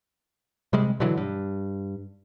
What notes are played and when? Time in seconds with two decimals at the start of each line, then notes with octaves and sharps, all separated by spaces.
0.73 C3 G3 G#3
1.00 B2 D3 E3 F#3
1.17 G2